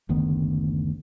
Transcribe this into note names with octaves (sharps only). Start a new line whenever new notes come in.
F#1 D2 D#3 B3